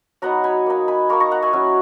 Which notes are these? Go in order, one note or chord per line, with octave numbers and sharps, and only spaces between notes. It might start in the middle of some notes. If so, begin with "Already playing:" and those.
F#3 B3 D#4 F#5 A#5
G#5 B5
A#3 D#4
G#5 B5
A#3 D#4 A#5 C#6
A#5 C#6
F#5 A#5
E5 G#5
F#3 C#4 E4